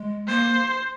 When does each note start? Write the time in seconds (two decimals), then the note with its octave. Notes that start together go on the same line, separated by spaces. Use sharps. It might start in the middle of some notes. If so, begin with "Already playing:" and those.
Already playing: G#3
0.27 A#3 C5